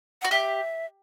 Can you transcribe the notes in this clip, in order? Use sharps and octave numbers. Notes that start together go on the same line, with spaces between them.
F#4 F#5
G4 E5